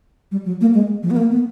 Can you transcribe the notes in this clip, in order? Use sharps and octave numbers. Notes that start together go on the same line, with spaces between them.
G3
F#3
A#3
G#3
F3
B3
A#3
B3